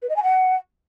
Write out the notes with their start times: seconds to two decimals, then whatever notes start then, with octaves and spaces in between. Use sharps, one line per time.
0.02 B4
0.09 D#5
0.16 G#5
0.23 F#5